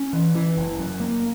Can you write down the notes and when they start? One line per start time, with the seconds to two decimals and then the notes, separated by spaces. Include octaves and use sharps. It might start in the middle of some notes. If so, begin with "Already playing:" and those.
Already playing: C#4
0.13 E3
0.35 E3
0.57 F#1
0.79 F#2
1.00 A#3